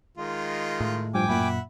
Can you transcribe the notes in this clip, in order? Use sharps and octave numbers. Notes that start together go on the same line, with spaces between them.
D#3 G#3 F4
A2
G2 F3 G5 G#5 D6
F#2 A#2 E5 F#5 B5